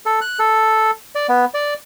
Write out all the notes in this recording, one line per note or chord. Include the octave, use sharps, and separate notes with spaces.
A4
F#6
A4
D5
B3
D5